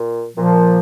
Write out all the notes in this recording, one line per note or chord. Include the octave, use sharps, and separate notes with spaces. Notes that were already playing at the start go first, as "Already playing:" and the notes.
Already playing: A#2
A#2 F3